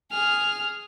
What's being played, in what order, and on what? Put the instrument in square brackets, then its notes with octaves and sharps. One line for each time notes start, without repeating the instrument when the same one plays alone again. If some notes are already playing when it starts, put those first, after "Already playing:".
[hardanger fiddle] G#4 [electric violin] F6